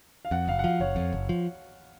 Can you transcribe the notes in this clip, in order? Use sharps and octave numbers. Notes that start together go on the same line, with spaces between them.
F5
F2 F#5
F#1 F5
F#5
F3 F5
F#1 C#5
F2
F#1
F3